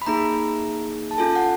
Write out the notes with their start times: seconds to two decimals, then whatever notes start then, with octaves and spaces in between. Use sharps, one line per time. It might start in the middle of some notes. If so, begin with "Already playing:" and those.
0.02 B5
0.07 A#3 D#4 G#4 A#5
1.11 A5
1.18 C#4 F4 A4 G#5
1.36 F#5